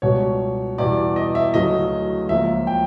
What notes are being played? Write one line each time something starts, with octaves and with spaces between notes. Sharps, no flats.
C#2 B2 G3 C#5
E2 B2 G3 D5
D#5
E5
D2 C#3 F#3 A3 D#5
C#2 C#3 F3 A#3 E5
G5